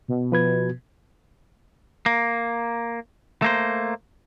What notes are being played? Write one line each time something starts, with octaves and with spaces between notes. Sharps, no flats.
B2
F3 B4 G#6
A#3
A3 A#3 C5